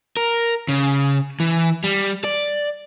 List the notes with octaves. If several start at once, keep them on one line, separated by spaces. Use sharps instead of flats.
A#4
C#3
E3
G3
D5